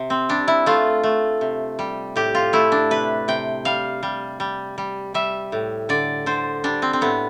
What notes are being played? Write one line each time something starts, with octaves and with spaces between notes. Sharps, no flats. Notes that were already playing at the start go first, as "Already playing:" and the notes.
Already playing: C3
C4
G3 D4
E4
A3 F4
A3
C3
G3
A2 G4
F4
A3 E4
D4
C3 B4
C3 G5
G3 F5
G3
G3
G3
G3 E5
A2
D3 D5
D3 C5
G3 D4
C4
C4
A2 B3